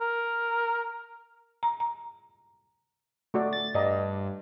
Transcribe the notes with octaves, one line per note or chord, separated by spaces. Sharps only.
A#4
A#5
A#5
A3 F#4 D5
A6
G2 D5 D#5 A#5